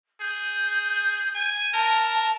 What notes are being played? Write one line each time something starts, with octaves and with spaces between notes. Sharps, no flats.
G#4 G6
G#5
A#4 A5